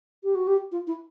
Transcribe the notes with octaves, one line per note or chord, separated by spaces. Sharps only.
G4
F#4
G4
F4
E4